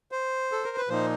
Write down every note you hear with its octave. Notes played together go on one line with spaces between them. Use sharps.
C5
A4
A#4
B4
A#2 F3 A#3 D#4 C5